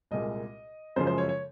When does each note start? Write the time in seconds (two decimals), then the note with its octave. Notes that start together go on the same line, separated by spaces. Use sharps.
0.11 C2 A#2 G#3 D#5
0.96 F#2 C#3 F3 G#3 C5
1.07 C5
1.18 C#5
1.29 C#5